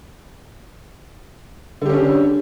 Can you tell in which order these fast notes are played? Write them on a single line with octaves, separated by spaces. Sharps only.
D3 G4 C#4 D4